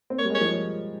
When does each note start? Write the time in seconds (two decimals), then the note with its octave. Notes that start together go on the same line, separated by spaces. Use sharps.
0.10 C4
0.19 A#3 C#5
0.25 G3
0.30 G#3 C#5
0.41 F3